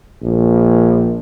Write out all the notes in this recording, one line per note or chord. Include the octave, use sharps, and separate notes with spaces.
A#1